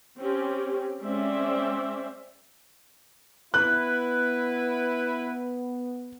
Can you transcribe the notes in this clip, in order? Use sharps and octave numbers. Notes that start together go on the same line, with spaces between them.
C4 C#4 G4
G#3 C4 C#4 C5 D5 E5
B3 E4 B4 F#6